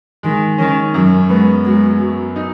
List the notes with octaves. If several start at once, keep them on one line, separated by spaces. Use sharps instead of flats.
D#3 G#3
D#3 C#4
F#2 F#3
G#3 B3
F#3 G#3
F#3
D#4